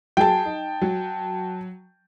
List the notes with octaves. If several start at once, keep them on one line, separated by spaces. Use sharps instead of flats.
F#3 G#4 G5 A5
D#4
F#3